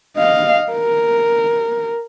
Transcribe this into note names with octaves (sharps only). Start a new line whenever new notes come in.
D#5 F5
A#4